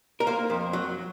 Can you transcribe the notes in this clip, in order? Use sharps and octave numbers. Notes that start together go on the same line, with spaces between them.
A#4
A#3 C5
F2
F#3